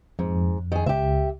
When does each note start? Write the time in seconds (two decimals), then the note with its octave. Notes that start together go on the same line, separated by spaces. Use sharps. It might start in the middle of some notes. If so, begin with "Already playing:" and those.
0.19 F2 G#2
0.72 D#3 G#4
0.86 C#2 G4 E5